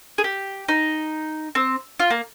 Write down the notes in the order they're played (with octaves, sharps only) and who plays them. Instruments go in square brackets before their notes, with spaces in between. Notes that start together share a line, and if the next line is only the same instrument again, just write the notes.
[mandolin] G#4
G4
D#4
C4
F4
A#3